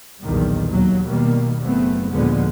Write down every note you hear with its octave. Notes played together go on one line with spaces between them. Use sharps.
B1 E2 G2 A#2 D#3 G3
D#2 B2 F#3 A#3
B2 D#3 G3 A#3
F#1 A3 B3 C4
D#2 A#2 D3 F3 G#3 B3